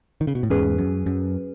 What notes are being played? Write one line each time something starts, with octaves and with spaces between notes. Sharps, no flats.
D#3
C#3
B2
A2
E2 G#2 C#4 G#4 B4
F#2
F#2